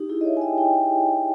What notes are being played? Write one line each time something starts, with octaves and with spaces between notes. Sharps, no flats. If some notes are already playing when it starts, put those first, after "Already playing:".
Already playing: D#4 G4
E4 G#4
D#5
C#5 E5
G#5
D#5 G5
D#5 G5